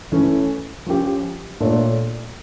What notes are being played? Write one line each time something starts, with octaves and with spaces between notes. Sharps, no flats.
E3 A3 C#4 E4
F3 C#4 G4
A#2 A3 D4 A4 C#5